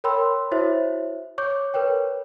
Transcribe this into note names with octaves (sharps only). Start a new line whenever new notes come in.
A#4 C#5 G5 B5 C6 E6
E4 F#4 C5 C#5 E5
C#5 C#6 D6 G6
A#4 B4 C#5 G5